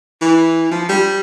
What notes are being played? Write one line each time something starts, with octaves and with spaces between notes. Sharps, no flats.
E3
F3
G3